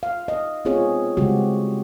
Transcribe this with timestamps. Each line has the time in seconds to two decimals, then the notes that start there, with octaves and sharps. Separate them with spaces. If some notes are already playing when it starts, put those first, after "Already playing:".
0.03 F5
0.28 D#5
0.65 B3 C4 F4 G#4 C#5
1.17 C#3 G3 G#3 C4 F#4 G4